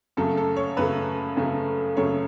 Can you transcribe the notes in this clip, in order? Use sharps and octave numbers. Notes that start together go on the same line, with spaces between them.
F#2 C#3 F#3 A3 A4
A4
C#5
F#2 C#3 F#3 A3 B4
F#2 C#3 F#3 A3
F#2 C#3 F#3 A3 C#5